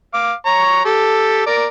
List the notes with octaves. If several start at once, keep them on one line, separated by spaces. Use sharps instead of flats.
F5 D6
C#5 A#5 C#6
G4 A4
A#4 D5